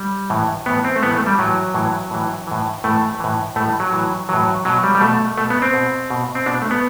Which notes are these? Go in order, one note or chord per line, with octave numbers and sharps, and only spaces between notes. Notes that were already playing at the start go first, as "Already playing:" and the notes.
Already playing: G3
A2 E3
A2 E3 B3
C4
A3
A2 E3 B3
A3
G3
A2 E3 F#3
A2 E3
A2 E3
A2 E3
A2 E3 A3
A2 E3
A2 E3 A3
F#3
A2 E3
A2 E3 F#3
B2 F#3
G3
G3
B2 A3
B2 A3
B3
C4
B2
B2
C4
B2 D4
A3
B3